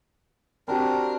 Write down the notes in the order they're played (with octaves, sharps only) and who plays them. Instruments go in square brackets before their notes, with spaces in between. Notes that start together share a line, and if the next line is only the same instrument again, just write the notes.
[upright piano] C4 F#4 G4 [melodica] D4 A#4